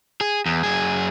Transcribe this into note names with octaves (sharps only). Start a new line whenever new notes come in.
G#4
E2
F#2 G#4